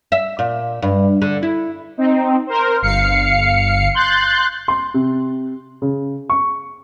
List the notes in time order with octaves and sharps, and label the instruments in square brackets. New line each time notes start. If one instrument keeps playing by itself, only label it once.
[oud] E5
A#2
G2
D3
E4
[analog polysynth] C4 D#4
A#4 C5
G1 F5 C7 C#7
C6 F#6 G6 A6
[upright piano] C6
C3
C#3
C#6